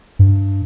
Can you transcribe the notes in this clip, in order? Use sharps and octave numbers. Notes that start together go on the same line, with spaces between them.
G2